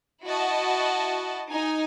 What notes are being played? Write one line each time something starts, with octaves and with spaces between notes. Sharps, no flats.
E4 F#4 D#5 A5
D#4 G#5